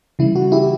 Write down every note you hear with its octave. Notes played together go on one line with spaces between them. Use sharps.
C#3 E3 G3 E4
F#4
E4 G4